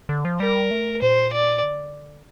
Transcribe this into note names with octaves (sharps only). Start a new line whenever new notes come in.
D3
F3
G3 A#4
A3
A#2 C5
D5
D3